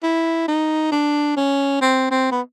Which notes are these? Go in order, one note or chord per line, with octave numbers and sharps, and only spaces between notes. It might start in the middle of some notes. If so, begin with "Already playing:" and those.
E4
D#4
D4
C#4
C4
C4
B3